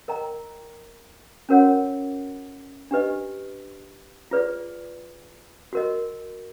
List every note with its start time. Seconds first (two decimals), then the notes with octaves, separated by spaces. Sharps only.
0.08 A#4 D#5 G5 A#5
1.49 C#4 F#4 A#4 C#5 F#5
2.91 D4 G4 B4 D#5
4.31 F4 G#4 B4 D5
5.73 F#4 A#4 D#5